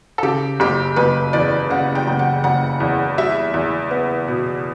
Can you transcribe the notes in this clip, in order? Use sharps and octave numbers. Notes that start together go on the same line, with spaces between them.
A4
C#3 G4
F#1 G4
F#1 B4
E2 D5
C#3 F#5
G5
F#1
F#5
F#1 F#5
E2
G3 E5
E2
B3
B2